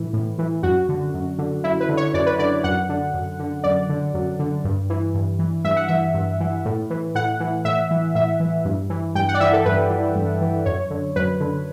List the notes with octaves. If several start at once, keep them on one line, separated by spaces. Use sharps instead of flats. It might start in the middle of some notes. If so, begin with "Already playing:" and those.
Already playing: A2 E3
A2
E3
F#2 F#4
D3
F#2
D3
F#2 E4
B4
D3
C#5
F#2 D5
B4
D3 D5
F#2 F#5
D3
F#2
D3
F#2 D5
D3
F#2
D3
G2
E3
G2
E3
G2 E5
F#5
E3 E5
G2
E3
A2
E3
A2 F#5
E3
A2 E5
E3
A2 E5
E3
G2
E3
G2 G5
F#5
D5
E3 E5
A4
G2 B4
E3
G2
E3
F#2 C#5
D3
F#2 B4
D3